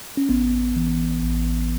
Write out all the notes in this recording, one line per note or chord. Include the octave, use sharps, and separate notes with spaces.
C#4
A1 B3
E3
A1